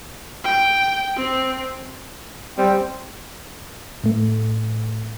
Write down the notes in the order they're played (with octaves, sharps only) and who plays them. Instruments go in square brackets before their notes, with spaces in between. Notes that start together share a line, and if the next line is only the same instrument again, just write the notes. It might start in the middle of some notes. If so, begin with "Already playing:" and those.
[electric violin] G5
C4
[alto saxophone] G3 [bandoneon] C4
[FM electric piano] A2 A3